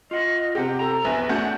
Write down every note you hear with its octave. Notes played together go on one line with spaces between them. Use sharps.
F4 D#5 F#5
C3 G4 F#5
A4 A#5
A#1 E2 B4 G#5
A3 C#4 D4 F#4 F#5 G6